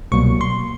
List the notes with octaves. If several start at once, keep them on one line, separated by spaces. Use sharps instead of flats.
C2 B2 F#3 A#3 C#6
C6